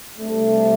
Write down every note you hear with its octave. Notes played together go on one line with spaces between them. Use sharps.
C3 G3 A3 D4